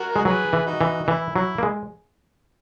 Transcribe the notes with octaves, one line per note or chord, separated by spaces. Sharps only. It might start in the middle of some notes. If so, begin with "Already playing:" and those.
Already playing: F#4 A#4
G#3
F#3 G#4 B4
E3
D#4 F#4
E3
D#4
E3 E4
F#3 E4
A#3
G#3